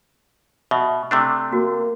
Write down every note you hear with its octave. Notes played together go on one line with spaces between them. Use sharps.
B2 E5
C3 A3 D4
A#3 F#4